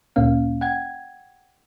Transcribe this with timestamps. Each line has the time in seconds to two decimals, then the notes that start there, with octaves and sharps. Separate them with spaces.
0.16 D2 A#2 A#3 C#4 F5
0.61 F#5 G5 G#6